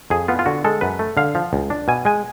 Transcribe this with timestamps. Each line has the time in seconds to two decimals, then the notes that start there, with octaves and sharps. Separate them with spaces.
0.10 F2 G#4
0.28 B3 F4
0.39 F4
0.46 D3 F#4
0.64 G#3 A4
0.81 F#2 B4
0.99 A3
1.17 D3 F5
1.35 F3
1.53 C#2
1.70 D4
1.88 B2 G#5
2.05 G#3 G#5